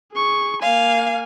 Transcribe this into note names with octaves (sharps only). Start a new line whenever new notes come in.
G#4 C#6
A#3 F5 G#5